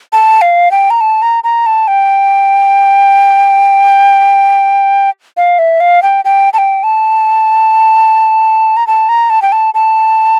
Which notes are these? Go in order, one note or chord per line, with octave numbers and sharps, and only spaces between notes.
A5
F5
G5
A#5
A5
A#5
A#5
A5
G5
F5
E5
F5
G5
G5
A5
G5
A5
A#5
A5
A#5
A5
G5
A5
A5